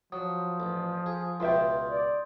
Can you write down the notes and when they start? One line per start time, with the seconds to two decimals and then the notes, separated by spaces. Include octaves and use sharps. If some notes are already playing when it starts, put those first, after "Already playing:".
0.12 F3 F#3 D#6
0.60 A1
1.06 G#4
1.40 C#2 B2 F4 E5 G5 C6 G6
1.90 D5